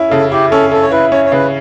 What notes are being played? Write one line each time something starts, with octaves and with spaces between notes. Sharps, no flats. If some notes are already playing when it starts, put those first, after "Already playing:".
Already playing: C#4 E4
C#3 A4
E4 G4
C#4 A4
C#4 A4
C#5
E4 B4
C#4 C#5
C#5
C#3 B4